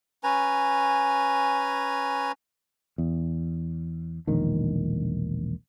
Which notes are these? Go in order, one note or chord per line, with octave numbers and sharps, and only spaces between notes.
C#4 B4 G#5 A#5
E2
E1 A#1 D#3